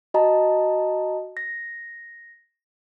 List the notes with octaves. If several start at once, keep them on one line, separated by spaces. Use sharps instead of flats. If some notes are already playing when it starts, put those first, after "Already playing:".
F#4 D#5 A5 A#5
A#6